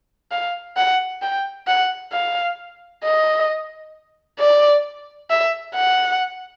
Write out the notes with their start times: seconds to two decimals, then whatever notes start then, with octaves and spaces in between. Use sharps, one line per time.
0.32 F5
0.77 F#5
1.22 G5
1.68 F#5
2.13 F5
3.04 D#5
4.40 D5
5.30 E5
5.75 F#5